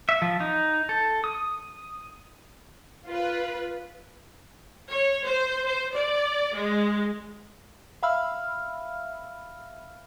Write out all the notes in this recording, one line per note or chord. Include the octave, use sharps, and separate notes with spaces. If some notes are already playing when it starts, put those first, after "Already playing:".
E5
F3
D#4
A4
D#6
F4 B4
C#5
C5
C5
D5
G#3
E5 F5 B5 E6 F6